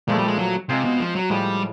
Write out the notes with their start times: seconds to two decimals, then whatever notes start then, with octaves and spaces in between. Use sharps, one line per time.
0.08 A#2 F3 G#3 A3
0.18 G3
0.28 G#3
0.39 F#3
0.69 C3 G#3 C4 F4 G#4 C5
0.85 B2
1.00 F3
1.15 F#3
1.30 A2 F3 G3 G#3